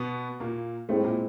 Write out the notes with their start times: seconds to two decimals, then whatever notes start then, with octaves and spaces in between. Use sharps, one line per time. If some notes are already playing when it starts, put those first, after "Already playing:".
Already playing: B2 B3
0.40 A#2 A#3
0.89 A2 G#3 A3 C4 E4
1.04 A#2 A#3